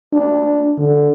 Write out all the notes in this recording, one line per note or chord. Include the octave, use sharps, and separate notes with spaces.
D4
D3